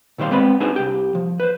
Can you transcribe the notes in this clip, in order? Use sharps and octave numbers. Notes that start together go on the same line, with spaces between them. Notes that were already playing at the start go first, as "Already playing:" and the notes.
A#2 D#3 G3 C5 F5
G#3 B3 C4 B4 D5 B5
D4 D#4 F#4 G#4 B4 C5
C2 G4
F3
B4 C5